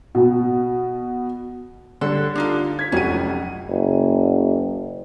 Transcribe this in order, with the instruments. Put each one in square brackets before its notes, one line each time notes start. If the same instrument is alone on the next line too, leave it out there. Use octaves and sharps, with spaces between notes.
[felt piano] B2 B3
[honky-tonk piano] D3 G3 [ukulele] A4
[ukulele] D4 D#4 F4
[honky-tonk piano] G#6 B6
[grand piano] F1 F#4 D#7 [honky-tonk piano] F2 C3 F#3 [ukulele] C#4
[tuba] F#1